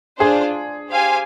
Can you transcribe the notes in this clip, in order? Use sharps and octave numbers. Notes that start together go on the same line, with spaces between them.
D4 F4 G#4 C5
G4 C5 F5 G#5